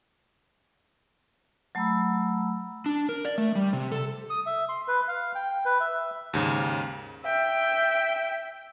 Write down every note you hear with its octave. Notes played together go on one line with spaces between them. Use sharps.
F#3 A3 A#5 B5 E6
D4
A#4
D5
A3
G3
C3
A4
D#6
E5
C6
B4
F5
G5
B4
E5
D#2 G#2 C#3
E5 G5